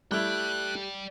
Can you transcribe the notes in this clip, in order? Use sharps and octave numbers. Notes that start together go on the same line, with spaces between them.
G3 A3 E4 D5 G5 F#6